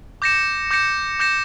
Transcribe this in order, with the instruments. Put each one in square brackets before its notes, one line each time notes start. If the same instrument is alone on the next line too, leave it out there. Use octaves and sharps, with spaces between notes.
[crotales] D6 G6 A#6 C#7 E7
D6 G6 A#6 C#7 E7
D6 G6 A#6 C#7 E7